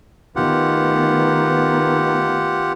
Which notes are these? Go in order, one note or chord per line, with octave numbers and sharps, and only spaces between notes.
D#3 A3 B3 F4 G4 F#5